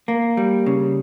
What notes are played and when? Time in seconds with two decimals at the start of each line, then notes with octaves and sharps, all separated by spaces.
0.08 A#3
0.37 G3
0.66 C#3